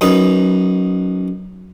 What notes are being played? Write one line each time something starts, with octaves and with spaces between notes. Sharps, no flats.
F#2 D#4 B4 D#6